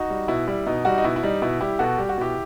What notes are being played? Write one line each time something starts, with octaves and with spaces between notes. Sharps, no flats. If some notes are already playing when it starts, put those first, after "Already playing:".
Already playing: D#4 F#4
G3
B2 E4
G3 E4
B2 D#4
G3 D#4 F#4
D#4
B2 E4
E4
G3 D#4
B2 E4
G3 E4 G4
B2 F#4 A4
G3 G4
F#4
B2 E4 G4